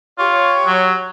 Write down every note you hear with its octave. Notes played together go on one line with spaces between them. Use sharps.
F4 G4 C#5
F#3